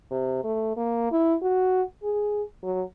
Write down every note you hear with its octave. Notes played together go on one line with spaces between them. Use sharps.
C3
A3
A#3
E4
F#4
G#4
F#3